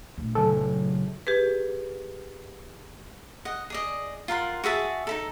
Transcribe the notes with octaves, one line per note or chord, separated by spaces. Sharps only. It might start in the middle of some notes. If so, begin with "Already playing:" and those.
A#1 A3
F#1 C#3 A4
G4 G#4 B4
D#5 F#5
G#4 D5 D#5
F4 A#4 F#5 C6
F#4 G#4 E5 A5
D#4 E4 A4